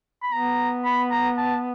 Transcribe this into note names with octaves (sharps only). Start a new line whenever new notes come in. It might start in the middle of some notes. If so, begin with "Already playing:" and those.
B5
B3 A#5
B5
A#5
A5